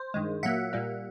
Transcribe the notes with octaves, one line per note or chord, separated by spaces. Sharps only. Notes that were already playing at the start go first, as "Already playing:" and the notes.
Already playing: C5
G2 D#3 G#3
A#2 F#3 A#3 E5 F#5
A#2 G3 A#3